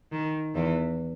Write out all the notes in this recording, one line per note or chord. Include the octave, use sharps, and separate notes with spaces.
D#3
E2 E3